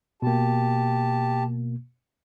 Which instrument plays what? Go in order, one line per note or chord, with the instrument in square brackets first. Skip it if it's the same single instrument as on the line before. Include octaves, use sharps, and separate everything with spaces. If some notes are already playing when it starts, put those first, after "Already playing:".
[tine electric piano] B2 A#3 [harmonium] G4 A5